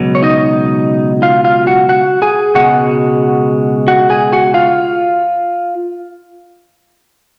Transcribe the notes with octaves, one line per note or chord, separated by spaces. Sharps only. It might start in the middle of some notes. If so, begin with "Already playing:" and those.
Already playing: C#2 B2 F#3
C#5
D#4 D#5
F4 F5
F4 F5
F#4 F#5
F#4 F#5
G#4 G#5
C#2 B2 G#3 F#4 F#5
F#4 F#5
G#4 G#5
F#4 F#5
F4 F5